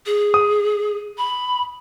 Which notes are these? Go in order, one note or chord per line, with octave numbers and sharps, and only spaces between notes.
G#4
D#6
B5